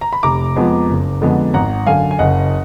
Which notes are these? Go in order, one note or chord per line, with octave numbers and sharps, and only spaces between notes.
A#5
B5
F1 A#5 D6
F2 F3 G#3 B3
F#1
F2 D3 G#3 B3
G#1 F#5 A#5
F#2 D3 F5 G#5
G#5
F#1 D#5 F#5